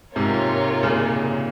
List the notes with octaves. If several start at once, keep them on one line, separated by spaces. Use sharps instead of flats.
G#2 C3 A#3 F4 A#4 C#5
A#2 C#3